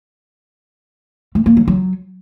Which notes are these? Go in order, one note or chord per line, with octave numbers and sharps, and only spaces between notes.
A3
A#3
F#3
F#3